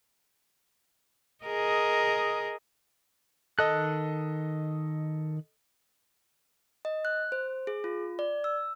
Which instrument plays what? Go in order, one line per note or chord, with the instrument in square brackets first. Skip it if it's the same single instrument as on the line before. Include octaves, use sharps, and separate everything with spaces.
[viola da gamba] G#4 A#4 D#5
[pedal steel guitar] D#3 F#6 [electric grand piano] A4 D#5
[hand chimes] D#5
F#6
C5
G#4
F4
D5
E6